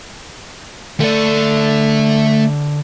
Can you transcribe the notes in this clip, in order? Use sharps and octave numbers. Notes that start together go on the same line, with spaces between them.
D3 A3 D5